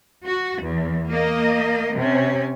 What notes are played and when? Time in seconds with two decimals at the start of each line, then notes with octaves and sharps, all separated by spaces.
0.23 F#4
0.61 E2
1.10 A#3 D#5
1.96 C3 C#4